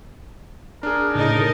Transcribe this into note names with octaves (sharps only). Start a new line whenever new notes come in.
D4 G#4 A#4
A2 C#3 D#4 A#4 D#5 A5